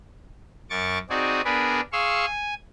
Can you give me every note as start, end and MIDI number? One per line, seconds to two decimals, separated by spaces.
0.70 0.98 42
0.70 0.98 85
0.70 0.98 86
0.70 0.98 93
1.10 1.41 60
1.10 1.41 63
1.10 1.41 66
1.10 1.41 68
1.10 1.41 74
1.44 1.80 59
1.44 1.80 62
1.44 1.80 68
1.44 1.80 70
1.44 1.80 71
1.44 1.80 74
1.92 2.25 68
1.92 2.25 77
1.92 2.25 84
1.92 2.25 85
1.92 2.25 88
2.26 2.54 80